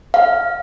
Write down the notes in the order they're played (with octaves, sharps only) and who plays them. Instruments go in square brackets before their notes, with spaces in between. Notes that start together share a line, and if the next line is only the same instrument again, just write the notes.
[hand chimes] F5